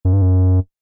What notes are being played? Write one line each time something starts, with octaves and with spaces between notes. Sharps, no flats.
F#2
G2
F#2